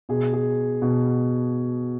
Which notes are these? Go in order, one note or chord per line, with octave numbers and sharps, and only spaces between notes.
B2 G#4
G#4
B2